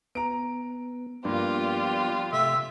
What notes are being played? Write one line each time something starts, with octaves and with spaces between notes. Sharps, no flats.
B3 A#5 D7
G2 F3 A#3 B3 F4 G4 D5
C3 A3 E5